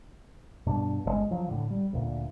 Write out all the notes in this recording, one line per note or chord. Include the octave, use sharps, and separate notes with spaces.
G2 B2 D4
G1 C3 G#3
F3 F#3
A2 D3
G3
D2 A#2